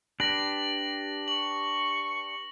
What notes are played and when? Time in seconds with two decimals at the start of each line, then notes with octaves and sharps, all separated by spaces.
0.20 D4 G4 B4 A#6 F#7
1.28 C#6 F#7